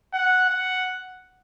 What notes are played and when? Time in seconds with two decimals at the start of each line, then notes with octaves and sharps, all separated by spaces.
0.13 F#5
0.49 F#5